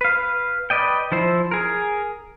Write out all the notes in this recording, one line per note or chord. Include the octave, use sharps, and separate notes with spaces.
B4 F5
B4 D5 D#5 G5
F3 E4 C5
G#4 A#4